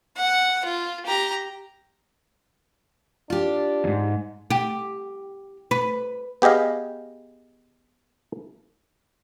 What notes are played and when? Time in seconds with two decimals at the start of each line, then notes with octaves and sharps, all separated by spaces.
0.17 F#5
0.65 F4
1.05 G4 A#5
3.30 D4 F4 G4
3.84 E2 G#2
4.50 G4
5.71 B4
6.42 B3 G4 G#4 D#5 F5